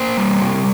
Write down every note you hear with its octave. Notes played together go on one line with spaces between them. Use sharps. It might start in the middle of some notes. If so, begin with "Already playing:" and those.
Already playing: A#3 C5
G3
C3